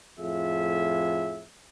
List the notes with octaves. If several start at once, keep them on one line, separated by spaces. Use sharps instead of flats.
F2 A2 F4 G#4 E5